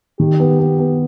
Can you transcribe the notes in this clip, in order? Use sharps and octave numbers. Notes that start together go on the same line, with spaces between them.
D#3 G4
B3
B3
B3